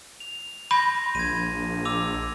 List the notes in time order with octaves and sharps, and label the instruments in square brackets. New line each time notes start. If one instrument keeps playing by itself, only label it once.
[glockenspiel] F7
[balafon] B5 [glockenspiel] C6 G6 A#6
[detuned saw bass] A#1 [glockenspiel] G#6 D#7
[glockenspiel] D6 E6 F7